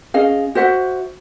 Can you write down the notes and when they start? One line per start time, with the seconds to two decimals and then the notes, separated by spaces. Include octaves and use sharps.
0.14 C#4 G#4 D#5 F5
0.55 F#4 C5 E5 F#5